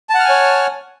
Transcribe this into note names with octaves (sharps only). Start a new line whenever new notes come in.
C#5 F#5 G#5 A5 F6